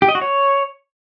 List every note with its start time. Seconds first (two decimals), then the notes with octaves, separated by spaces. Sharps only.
0.02 G4
0.09 D#5
0.15 F#4
0.21 C#5